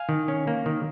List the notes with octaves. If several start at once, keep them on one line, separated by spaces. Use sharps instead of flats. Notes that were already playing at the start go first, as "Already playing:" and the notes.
Already playing: F5 G#5
D#3
C#4
A#3
D#3